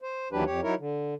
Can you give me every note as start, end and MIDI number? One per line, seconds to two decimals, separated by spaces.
0.02 0.28 72
0.32 0.44 39
0.32 0.44 52
0.32 0.44 54
0.32 0.44 62
0.32 0.44 67
0.32 0.44 71
0.46 0.60 41
0.46 0.60 67
0.46 0.60 73
0.63 0.75 54
0.63 0.75 63
0.63 0.75 64
0.63 0.75 70
0.63 0.75 73
0.79 1.14 50